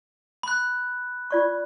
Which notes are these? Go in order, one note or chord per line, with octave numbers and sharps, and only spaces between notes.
B5 F#6
F4 D5 C#6